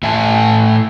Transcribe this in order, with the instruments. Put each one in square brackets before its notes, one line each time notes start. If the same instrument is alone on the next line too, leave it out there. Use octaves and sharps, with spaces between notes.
[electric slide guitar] A2 E5 G#5 A5